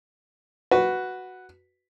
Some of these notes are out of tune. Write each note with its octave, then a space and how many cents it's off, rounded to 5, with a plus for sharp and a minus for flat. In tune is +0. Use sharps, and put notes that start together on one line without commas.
F#4 +0 B4 +0